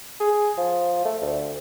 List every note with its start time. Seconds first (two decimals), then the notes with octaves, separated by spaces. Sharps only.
0.20 G#4
0.57 F3
1.05 A3
1.22 D2